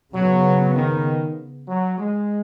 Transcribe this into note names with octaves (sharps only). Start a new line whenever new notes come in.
C#3 F#3 B3
D#3
F#3
G#3